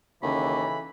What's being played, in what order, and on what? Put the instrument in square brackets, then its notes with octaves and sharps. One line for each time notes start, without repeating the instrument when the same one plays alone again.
[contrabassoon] D#2 [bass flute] C#3 [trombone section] E3 A4 [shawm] B5